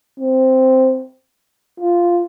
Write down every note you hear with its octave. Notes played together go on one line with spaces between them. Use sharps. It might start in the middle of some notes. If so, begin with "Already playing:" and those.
C4
F4